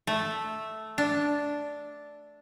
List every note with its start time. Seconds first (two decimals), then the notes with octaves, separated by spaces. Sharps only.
0.07 A3
0.98 D4